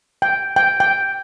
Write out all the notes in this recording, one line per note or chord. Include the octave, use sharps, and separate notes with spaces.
G5
G5
G5